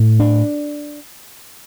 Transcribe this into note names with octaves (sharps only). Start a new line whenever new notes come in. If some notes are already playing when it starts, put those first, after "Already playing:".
Already playing: A2
D4